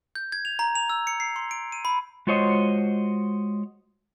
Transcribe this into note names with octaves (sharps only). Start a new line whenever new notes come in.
G6
G#6
F7
A#5
F7
E6
C#7
C7
C6
D7
D#7
B5
G#3 F4 F#4 C5 C#5 D#5